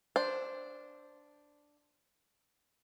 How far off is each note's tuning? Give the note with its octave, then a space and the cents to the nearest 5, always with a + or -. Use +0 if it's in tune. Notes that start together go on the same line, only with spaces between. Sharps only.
D4 +0 C5 +0